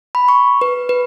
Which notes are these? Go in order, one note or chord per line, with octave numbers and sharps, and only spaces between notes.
B5
C#6
B4
B4